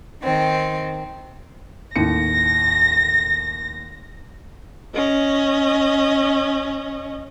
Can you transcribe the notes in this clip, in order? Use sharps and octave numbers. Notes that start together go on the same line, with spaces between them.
D#3 C4
D#2 A2 A#6 C#7
C#4 D#5